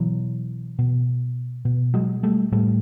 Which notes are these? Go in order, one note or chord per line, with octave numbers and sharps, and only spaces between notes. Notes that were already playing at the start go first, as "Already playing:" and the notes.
Already playing: B2 E3 F#3
B2
B2
F#3 G#3
G3 A3
A2 G3 A3